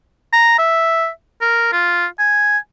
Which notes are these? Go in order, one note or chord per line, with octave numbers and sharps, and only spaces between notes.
A#5
E5
A#4
F4
G#5